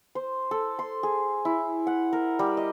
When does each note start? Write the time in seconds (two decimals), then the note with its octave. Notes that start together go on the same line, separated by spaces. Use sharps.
0.15 C5
0.51 A4
0.79 C6
1.03 G#4
1.45 E4
1.87 F#5
2.13 A#4
2.39 G3
2.57 D#5